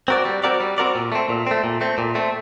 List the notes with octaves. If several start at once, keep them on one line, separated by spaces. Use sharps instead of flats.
C4 F#4 A#4 D5
G3
C4 F#4 A#4 D5
G3
C4 F#4 A#4 D5
A#2
A3 C4
A#2
A3 C4
A#2
A3 C4
A#2
A3 C4